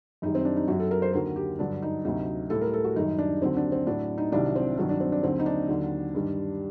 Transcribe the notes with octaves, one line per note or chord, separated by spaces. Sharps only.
F#2 D#3 G3 D#4
C4
D4
D#4
F#2 F#3 F#4
A4
A#4
C5
D#2 D3 F#3 A#4
G4
G2 D3 F#3 D4
D#4
D2 C3 F#3 D#4
A2 G3 A4
A#4
A4
F#4
F#2 D#3 G3 D#4
D4
D#2 D3 F#3 C4
D4
C4
A2 F#3 D4
D#4
C2 C3 D#3 F#3 D4
C4
G2 D#3 F#3 D4
D4
C4
D4
D#2 D3 F#3 C4
D#4
D4
D#2 D3 F#3
G2 D#3 G3